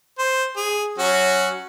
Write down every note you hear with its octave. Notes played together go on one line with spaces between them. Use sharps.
C5
G#4
F#3 C#4 F#4